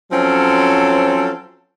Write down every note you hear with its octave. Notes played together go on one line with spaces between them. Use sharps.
F3 F#3 C4 C#4 A4